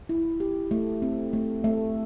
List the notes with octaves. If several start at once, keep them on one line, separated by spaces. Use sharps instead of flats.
E4
G4
A3
C4
A3
A3